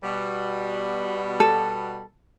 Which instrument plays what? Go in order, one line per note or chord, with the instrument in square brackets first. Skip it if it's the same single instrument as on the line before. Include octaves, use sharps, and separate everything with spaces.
[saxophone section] B2 G3
[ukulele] A4